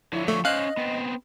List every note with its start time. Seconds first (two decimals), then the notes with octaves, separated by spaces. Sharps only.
0.13 D3 F3 E4 C#5
0.28 A3 C#6
0.45 C#4 C5 D#5 F5 F#6
0.77 B3 C4